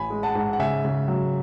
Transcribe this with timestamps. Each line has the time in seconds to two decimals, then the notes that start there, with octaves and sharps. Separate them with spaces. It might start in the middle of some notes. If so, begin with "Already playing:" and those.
Already playing: A1 G#5 B5
0.10 G#3
0.23 F#5 A5
0.35 G#2
0.53 F#5
0.59 C#3 E5 G#5
0.85 C#3
1.08 F#3